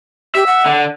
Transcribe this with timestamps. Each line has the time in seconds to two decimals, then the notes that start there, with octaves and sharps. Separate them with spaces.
0.35 G4 E5
0.47 F#5
0.66 D3